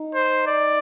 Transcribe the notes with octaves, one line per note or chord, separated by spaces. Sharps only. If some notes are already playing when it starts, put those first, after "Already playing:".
Already playing: D#4
C5
D5